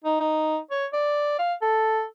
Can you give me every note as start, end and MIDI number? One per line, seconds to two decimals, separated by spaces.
0.04 0.16 63
0.20 0.57 63
0.71 0.86 73
0.93 1.36 74
1.39 1.54 77
1.62 2.04 69